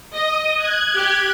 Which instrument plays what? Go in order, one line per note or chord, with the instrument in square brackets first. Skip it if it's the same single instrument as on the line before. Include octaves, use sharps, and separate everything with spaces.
[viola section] D#5 [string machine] D#6
[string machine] F#6 G#6
[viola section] G4